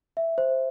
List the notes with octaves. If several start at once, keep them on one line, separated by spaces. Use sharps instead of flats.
E5
C5